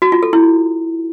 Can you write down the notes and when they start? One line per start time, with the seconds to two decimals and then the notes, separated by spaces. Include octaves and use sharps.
0.02 F#4
0.12 F4
0.23 A4
0.33 E4